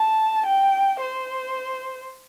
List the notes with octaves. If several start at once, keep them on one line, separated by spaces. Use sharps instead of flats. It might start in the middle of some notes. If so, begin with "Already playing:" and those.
Already playing: A5
G5
C5